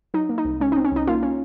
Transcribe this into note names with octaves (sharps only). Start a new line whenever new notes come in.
F#3 D#4
A#3
D#4
C2
G#3 C#4
D#4
C4
C#4
C2 D#4
A#3 F4
C#4